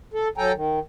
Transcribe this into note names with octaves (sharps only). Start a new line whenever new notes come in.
A4
F#3 A4 G5 G#5 A#5
D#3